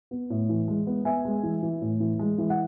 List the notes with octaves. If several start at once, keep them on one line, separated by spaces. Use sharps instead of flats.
B3
A2
E3
G#3
B3
B3 E5 G#5
G#3
E3
E3
A2
E3
G#3
E3
F#5